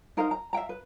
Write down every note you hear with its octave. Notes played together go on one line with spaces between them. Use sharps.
D#4 A#4 C5 F5
A#5
E5 F5 G5 A#5
B4